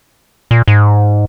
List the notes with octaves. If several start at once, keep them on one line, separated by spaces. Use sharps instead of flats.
A#2
G#2